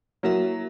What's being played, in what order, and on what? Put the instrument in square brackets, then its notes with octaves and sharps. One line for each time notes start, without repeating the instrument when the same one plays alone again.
[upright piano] F#3 [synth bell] A#3 E4 A#4 E5